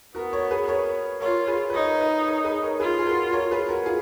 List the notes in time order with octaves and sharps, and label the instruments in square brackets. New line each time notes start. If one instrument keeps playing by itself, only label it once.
[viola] B3 [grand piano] F#4 A#4
[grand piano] A#4 C#5
G#4 B4
A#4 C#5
[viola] F4 [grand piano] A#4 C#5
[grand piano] G#4 B4
B4
[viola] D#4 [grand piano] A#4 C#5
[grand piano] B4 D#5
A#4 C#5
G#4 B4
A#4 C#5
[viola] F4 [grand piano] G#4 B4
[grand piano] G#4
F#4 A#4
A#4 C#5
G#4 B4
F#4 A#4
F4 G#4